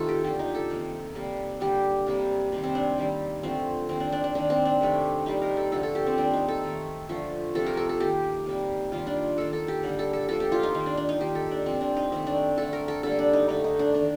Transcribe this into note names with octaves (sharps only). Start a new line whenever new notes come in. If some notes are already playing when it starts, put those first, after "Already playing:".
Already playing: C3 D#3 A3 D#4 F4 A4
G4
D3 F3 A#3 G4
D#4
A4
C3 D#3 A#3
C3 G3 A#3
D3 G3 A#3 G4
C3 G3 A#3
C3 D#3 G3
C4
D4
D#3 G3 A#3
D3 F3 A3 C4
D#3 A#3 C4
D4
D4
D4
D#3 A#3 D4
C4
D4
C3 D#3 A3
C3 G3 A#3 D#4
A#4
A4
D3 F3 A3 A4
A4
G4
C4
D#3 G3 A#3 D4
D#4
A4
D#3 A3
D3 F3 A3
C3 F3 A3 A4
A#4
A4
A4
D#3 A#3 G4
C3 G3 A#3
D#3 G3 A#3 F4
D4
D#3 A#3 A4
A4
G4
D3 G3 A#3
A4
A4
D3 F3 A#3 A4
G4
F4
D#4
D#3 A#3 D#4
D4
D4
D#4
D#3 A#3 G4
A4
D4
C3 F3 A#3 C4
D4
D#4
D#3 A3 C4
D4
D3 A3 A4
A#4
A4
D3 G3 A#3 A4
D4
D#4
D3 A3 D#4
D#4
D4
D#3 A#3 D4